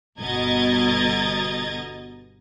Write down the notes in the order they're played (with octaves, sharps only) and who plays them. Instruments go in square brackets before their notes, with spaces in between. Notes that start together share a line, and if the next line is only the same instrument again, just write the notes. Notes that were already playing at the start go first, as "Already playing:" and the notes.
[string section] G1 B2 D#5 A#5 G#6 A6